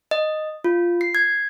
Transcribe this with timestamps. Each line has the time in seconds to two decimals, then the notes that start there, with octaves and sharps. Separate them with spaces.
0.11 D#5
0.64 F4
1.01 C7
1.15 G#6